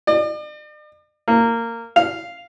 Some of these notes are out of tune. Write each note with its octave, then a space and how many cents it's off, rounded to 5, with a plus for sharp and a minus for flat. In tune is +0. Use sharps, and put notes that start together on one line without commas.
D5 +45
A#3 -20
F5 -5